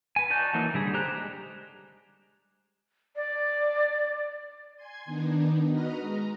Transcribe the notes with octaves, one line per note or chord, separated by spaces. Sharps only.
B4 G#5
D#4 F#4 D5 A5 G6
E3 F#3 A#3 D#4
D3 G3 G#4
G4 C5 A#5 F#6
G#3
D5
G#5 C6 G#6
D#3 B3 D4 D#4
F#4 B4 D#5 A#5 D#6 F6
G#3 A#5